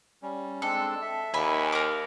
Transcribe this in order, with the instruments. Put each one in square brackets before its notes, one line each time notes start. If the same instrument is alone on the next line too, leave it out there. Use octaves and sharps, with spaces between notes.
[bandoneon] G3 C#4
[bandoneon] G#3 C4 D4 [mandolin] A4
[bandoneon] E5
[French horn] D#2 [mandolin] B4 G#5
[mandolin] A#4 D6